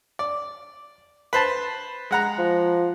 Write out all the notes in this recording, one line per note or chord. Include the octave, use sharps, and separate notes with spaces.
D5
B4 C5 A5
G#3 F#5 A#5
F3